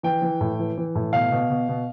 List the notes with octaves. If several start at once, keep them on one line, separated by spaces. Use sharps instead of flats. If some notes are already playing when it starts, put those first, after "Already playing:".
E3 G5
E3
A2
E3
E3
A2
B2 F5
B2
B2
B2